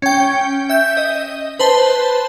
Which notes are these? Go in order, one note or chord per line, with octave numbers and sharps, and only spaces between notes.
C#4 G5
E5 G6
D#5
B4 C5 A5